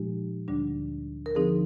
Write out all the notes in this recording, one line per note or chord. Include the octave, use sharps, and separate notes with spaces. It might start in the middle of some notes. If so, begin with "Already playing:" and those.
Already playing: A#2 F3 G#3 D#4 G4
D2 D3 G3 D4
A#4
D3 F3 C4 D#4 G#4